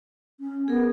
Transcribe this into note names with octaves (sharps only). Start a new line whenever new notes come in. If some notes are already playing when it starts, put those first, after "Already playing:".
C#4
B3 G#4 A#4